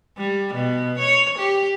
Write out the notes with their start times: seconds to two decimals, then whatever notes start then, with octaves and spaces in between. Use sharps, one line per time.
0.17 G3
0.54 B2
0.99 C#5
1.39 G4